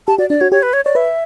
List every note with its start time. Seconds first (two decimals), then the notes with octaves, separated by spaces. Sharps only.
0.07 G4 A5
0.19 F#4 D5
0.30 D4 D5
0.41 F#4 C#5
0.52 G4 C#5
0.63 B4
0.73 C#5
0.85 C#5 D5
0.95 B4 E5